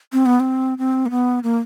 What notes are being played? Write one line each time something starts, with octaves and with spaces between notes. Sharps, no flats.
C4
B3
C4
C4
A#3
B3
A#3